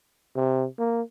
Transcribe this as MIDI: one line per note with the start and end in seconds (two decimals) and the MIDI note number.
0.36 0.66 48
0.78 1.02 58